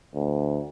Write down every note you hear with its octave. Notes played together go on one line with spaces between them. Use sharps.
D2